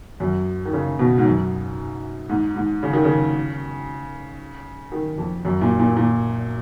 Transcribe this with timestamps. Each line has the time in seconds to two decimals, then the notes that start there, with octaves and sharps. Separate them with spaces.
0.20 F#2
0.65 D#3
0.73 C#3
0.99 B2
1.18 G#2
1.25 F#2
2.29 G#2
2.56 G#2
2.83 C#3
2.93 D#3
3.04 C#3
4.92 D#3
5.18 F2
5.45 F#2
5.61 A#2
5.79 A#2
5.97 A#2